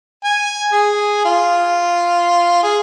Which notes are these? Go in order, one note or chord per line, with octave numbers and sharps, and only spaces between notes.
G#5
G#4
F4
G#4